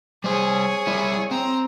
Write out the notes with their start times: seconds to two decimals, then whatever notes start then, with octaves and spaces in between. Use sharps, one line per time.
0.24 G3 G#4 C5 C#5
0.87 G3 E4
1.31 C4 A#5